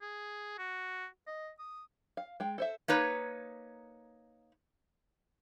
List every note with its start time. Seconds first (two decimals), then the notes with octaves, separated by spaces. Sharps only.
0.02 G#4
0.58 F#4
1.27 D#5
1.59 D#6
2.17 F5
2.40 G#3 G5
2.58 A4 C5 E5
2.88 A#3 D#4 B4 C#5